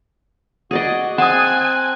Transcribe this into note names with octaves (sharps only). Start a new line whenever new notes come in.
F#4 G#4 D5 D#5
C4 F#5 G#5 A5 D#6 F#6